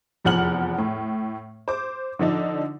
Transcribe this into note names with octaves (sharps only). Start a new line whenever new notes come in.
F1 E2 F3 F#5 F6 F#7
A2
C5 D6
D3 F3 D4 D#4